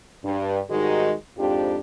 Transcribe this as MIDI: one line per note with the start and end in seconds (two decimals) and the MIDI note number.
0.23 0.59 43
0.69 1.11 44
0.69 1.11 51
0.69 1.11 55
0.69 1.11 56
0.69 1.11 63
0.69 1.11 66
1.37 1.77 41
1.37 1.77 44
1.37 1.77 53
1.37 1.77 62
1.37 1.77 67